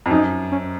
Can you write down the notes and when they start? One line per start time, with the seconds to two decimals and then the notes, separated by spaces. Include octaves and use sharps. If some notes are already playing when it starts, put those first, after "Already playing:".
0.06 F2
0.10 F#2 D#4
0.51 C#4